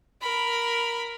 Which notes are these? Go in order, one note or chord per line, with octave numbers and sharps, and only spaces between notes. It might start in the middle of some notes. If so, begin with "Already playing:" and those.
A#4 B5